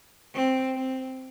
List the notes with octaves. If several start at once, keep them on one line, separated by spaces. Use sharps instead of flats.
C4
C4